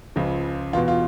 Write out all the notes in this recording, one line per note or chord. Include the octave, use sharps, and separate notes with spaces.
C#2 C#3 F3
E2 B2 F4
F4